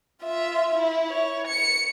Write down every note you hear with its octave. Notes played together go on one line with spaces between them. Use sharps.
F4 E5
E4
C#5
C#7